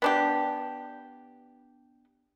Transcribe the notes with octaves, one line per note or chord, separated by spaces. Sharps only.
B3 D4 G4